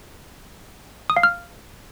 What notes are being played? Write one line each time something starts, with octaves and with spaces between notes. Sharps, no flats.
D#6
F5
F6